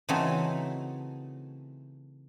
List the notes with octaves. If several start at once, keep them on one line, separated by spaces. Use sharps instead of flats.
C#3 E3 A3 C4 D#4 F#4